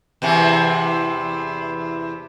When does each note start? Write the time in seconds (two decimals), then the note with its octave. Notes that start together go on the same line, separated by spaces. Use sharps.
0.22 E2 C3 E3